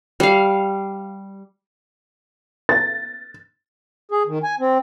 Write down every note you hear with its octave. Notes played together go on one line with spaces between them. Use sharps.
G3 F5
A6
G#4
D#3
G#5
C4